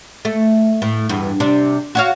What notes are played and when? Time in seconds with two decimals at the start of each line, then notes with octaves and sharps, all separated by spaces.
0.25 A3
0.82 A2
1.09 E2 G2
1.40 C3 D4
1.95 F#4 C#5 F5